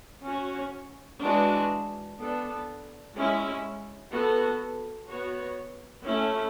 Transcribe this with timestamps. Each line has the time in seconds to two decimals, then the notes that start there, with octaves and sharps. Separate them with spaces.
0.25 C#4 F#4 C#5
1.22 E3 G#3 D4 F#4
2.19 B3 D4 A4
3.15 G#3 C#4 E4
4.12 B3 F#4 A4
5.08 B3 F#4 C#5
6.05 A3 C#4 E4